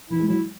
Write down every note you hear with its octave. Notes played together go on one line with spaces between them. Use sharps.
E3 E4
G#3
F#3 E4